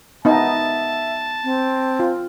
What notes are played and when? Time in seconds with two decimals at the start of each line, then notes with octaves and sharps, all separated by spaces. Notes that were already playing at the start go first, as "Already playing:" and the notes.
0.25 B3 D#4 D#5 E5 A5
1.44 C4
2.00 F4